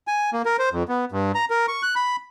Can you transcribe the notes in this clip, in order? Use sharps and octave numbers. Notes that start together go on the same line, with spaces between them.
G#5
A#3
A#4
C5
F2
B3
G2
A#5
A#4
C#6
F#6
B5